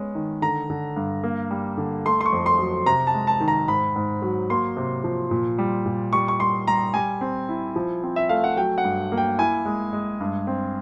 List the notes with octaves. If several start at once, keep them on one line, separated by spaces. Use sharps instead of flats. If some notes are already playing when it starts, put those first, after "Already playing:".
Already playing: G#3 B3 C#4
D#3
D3 A#5
D3
G2
A#3
G3
D3
A3 C6
C6
C#6
F2
C6
F#3
C3 A#5
A5
G#3
A5
D#3
A#5
G#2 B5
G#2
F#3
A#3 C6
C3
F3
A#2
G3
A#2
G3 C#6
C#6
G3 C6
G3 A#5
G3 G#5
C4
E4
F3
C4
E5
A3 F5
F#5
F#3 G5
F#5
G2
A#3
G5
E4 G#5
G#3
G#3
G2
C4